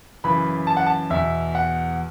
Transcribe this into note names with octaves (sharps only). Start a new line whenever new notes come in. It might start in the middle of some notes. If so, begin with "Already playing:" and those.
F#2 C#3 E3 B5
A5
F#5
A5
E2 B2 E5
F#5